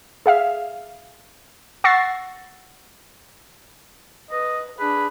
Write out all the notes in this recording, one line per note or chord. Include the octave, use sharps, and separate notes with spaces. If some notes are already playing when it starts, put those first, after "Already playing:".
G#4 E5 F5
F#5 C#6 E6 A6 A#6 C7
B4 D#5
D4 G#4 B4